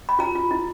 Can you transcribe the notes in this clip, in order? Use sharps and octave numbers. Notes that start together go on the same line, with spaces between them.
B5
F4 A#5
F4
E4